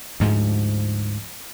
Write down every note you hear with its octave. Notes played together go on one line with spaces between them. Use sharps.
D2 G#2 F3